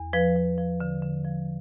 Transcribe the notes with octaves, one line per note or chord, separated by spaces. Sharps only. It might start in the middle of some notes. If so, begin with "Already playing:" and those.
Already playing: E2
F3 B4
F3
F3
D3
D3
F3